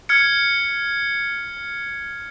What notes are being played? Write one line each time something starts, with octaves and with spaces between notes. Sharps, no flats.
F6 G#6 C#7